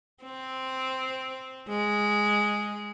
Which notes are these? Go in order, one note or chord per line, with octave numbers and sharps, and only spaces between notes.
C4
G#3